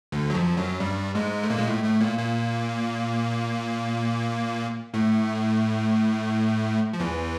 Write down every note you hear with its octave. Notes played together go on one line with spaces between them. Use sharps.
D2 D3
F#3
F2 F3
F#2 F#3
G2 G3
G#2 G#3
A3
A#2 A#3
G#3
A2 A3
A2 A3
A#2 A#3
A#2 A#3
A2 A3
F3
E2 E3